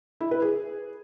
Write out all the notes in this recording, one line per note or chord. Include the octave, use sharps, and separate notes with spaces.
E4
B4
G#4